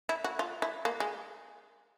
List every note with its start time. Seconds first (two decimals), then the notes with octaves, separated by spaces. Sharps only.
0.09 E4
0.24 F#4
0.39 F4
0.62 E4
0.85 A#3
1.00 G#3